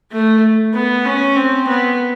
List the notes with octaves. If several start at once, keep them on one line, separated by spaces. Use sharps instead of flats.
A3
B3
C#4
C4
B3